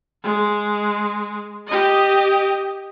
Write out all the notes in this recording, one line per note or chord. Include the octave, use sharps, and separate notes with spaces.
G#3
G4 D#5